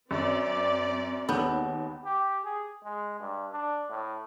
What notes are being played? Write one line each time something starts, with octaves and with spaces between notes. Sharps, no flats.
F#2 C4 D5
D#2 B3 E6 G6
G4
G#4
G#3
G2
D4
A2